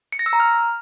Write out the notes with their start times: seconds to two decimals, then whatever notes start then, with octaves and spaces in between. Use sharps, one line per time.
0.12 C#7
0.19 A#6
0.26 E6
0.33 A#5
0.40 F6